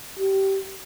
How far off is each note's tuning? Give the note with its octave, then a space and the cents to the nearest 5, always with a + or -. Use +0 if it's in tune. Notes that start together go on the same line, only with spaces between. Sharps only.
G4 -20